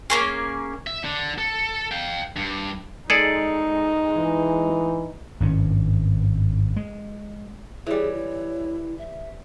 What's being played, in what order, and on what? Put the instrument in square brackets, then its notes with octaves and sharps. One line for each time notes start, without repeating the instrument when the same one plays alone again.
[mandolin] A#3 C#4 G#4
[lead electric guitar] E5
D3
A4
F5 G5
G2
[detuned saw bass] G#3 [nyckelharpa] D#4 [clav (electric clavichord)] G#4 A4 D5
[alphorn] E3
[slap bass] G#1 G2 C#4
G#3
[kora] E3 G3 [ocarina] G#4 [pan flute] C#5
[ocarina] E4
[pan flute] E5